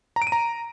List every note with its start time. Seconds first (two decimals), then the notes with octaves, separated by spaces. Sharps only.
0.16 A#5
0.22 D7
0.27 D#7
0.32 A#5